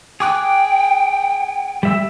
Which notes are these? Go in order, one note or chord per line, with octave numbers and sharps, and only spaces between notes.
G#4 G5 D6 F#6
G3 E5 E6